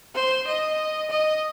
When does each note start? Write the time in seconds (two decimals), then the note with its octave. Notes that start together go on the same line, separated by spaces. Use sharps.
0.15 C5
0.47 D#5
1.10 D#5